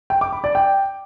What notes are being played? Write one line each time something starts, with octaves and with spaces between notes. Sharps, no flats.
G5
D6
B5
D5
G5